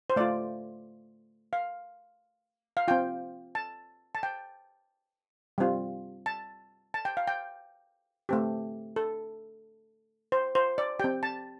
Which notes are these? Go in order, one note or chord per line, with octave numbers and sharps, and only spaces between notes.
C5
A3 F4 D5
F5
F5
C4 F4 G5
A5
A5
G5
G3 C4 F4
A5
A5
G5
F5
G5
A3 C4 G4
A4
C5
C5
D5
C4 G4 G5
A5